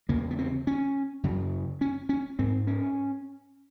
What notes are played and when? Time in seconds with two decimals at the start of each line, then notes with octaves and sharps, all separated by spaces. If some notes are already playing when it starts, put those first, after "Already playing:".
0.09 E2 C#3 A#3
0.31 B3
0.38 C4
0.67 C#4
1.23 F#2 C#3
1.81 C#4
2.09 C#4
2.39 G#2 C4
2.67 C#4